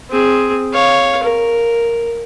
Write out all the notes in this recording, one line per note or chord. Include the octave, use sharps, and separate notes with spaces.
C4 G#4
C#5 F5
A#4